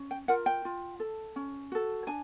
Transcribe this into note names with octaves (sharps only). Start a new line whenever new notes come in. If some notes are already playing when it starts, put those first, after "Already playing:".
Already playing: C#4
G5
F4 A#4 F#5
G5
F4
A4
C#4
F#4 A4
D4 G#5